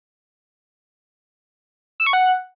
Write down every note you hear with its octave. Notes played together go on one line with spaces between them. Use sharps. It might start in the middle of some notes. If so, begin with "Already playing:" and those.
E6
C#6
F#5